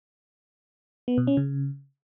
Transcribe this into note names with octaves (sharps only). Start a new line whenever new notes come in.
B3
B2
C#4
C#3